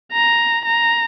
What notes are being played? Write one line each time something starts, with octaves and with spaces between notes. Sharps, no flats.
A#5
A#5